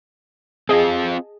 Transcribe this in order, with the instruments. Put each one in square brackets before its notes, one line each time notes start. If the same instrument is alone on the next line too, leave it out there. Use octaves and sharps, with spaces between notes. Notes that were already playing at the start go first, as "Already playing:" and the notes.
[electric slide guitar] C4 F4 [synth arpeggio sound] G#4 D#5 A5